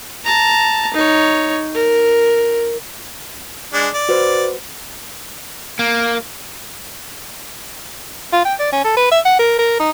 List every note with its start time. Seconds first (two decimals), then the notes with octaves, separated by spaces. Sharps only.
0.24 A5 A#5
0.94 D#4 C#5
1.74 A#4
3.73 G#3 D4
3.94 D5
4.09 F#4 B4 C5
5.79 A#3
8.33 F4
8.45 G5
8.59 D5
8.72 C#4
8.85 A4
8.97 B4
9.12 E5
9.25 F#5
9.39 A#4
9.59 A#4
9.80 D#4